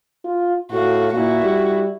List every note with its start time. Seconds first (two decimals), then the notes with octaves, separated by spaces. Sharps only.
0.25 F4
0.71 A2 F#4 F5
1.14 A#2 E4 F#4
1.44 G3